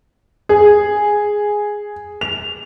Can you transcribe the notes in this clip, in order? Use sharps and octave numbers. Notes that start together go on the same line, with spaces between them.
G#4
F7